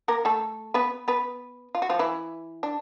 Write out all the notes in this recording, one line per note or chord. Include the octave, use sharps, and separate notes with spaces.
A#3 A#4
A3 A4
B3 B4
B3 B4
F4
F#4
F3 F4
E3 E4
D4